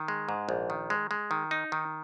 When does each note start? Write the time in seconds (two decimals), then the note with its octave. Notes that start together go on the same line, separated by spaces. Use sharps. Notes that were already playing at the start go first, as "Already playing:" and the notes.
Already playing: D#3
0.08 G#3
0.29 G#2
0.49 A#1
0.70 D#3
0.90 G#3
1.11 G#3
1.31 D#3
1.51 D#4
1.72 D#3